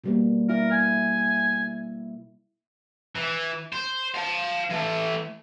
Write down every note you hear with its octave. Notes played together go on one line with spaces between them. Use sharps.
B2 G3 A#3
E4 A#4
G#5
E3
C5
F5 A5
E3 A3